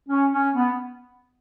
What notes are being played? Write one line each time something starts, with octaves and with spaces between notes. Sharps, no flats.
C#4
C#4
B3